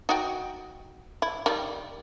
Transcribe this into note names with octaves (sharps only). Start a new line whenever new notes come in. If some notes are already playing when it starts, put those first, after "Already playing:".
D#4 F#4 G5
E4
D#3 G3